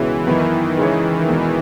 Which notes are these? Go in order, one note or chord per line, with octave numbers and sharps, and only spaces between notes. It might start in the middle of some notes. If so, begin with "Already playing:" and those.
Already playing: C#2 B2 E3 G#3 C#4
F#2 D#3 E3 B3 E4
C#3 G#3 C#4 G#4 C#5
E2 B2 G#3